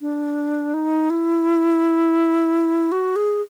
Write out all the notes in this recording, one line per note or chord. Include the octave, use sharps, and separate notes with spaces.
D4
D#4
E4
F#4
G#4